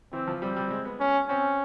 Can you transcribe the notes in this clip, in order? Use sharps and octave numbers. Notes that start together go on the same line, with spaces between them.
E3 C4
F3
G3 C4
G3
G#3
B3
C#4
C4 C#4